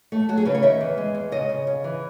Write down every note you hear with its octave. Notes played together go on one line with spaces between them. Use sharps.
A3
F#3 F#4
G#4
C#3 B4
C#5
D#3 E5
E2
G#3
E2
C#3 D#5
C#3
C#3
E3